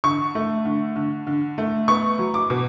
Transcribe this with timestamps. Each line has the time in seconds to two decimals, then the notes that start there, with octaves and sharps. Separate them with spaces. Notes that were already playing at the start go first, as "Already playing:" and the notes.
0.04 D3 C#6
0.35 A3
0.65 D3
0.96 D3
1.27 D3
1.58 A3
1.88 B3 C#6
2.19 F#3
2.34 D6
2.50 B2